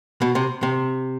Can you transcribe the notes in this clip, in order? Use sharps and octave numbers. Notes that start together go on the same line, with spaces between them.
B2
C3
C3